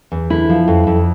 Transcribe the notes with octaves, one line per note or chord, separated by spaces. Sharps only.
E2
D3 E4
F3
F2
F2